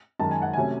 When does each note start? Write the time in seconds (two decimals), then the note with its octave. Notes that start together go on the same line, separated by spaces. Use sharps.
0.19 F#2 D#3 G#3 A5
0.31 G#5
0.42 F#5
0.53 C3 F#3 A3 C#4 G#5